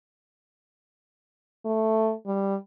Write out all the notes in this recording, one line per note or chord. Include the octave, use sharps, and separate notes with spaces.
A3
G3